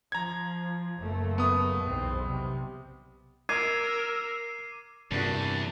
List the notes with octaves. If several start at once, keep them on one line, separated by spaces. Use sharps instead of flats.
F3 A#5 G#6
F#1 A3 A#3
B3 D#6
B1 E2 C4
C3 G3
A#4 D6 E6 G#6 C7 D#7
E2 G2 C3 A#3 D4 F#4 A5